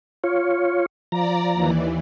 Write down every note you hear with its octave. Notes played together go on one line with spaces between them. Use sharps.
F4 C#5
F3 D5 A#5
D#2 E3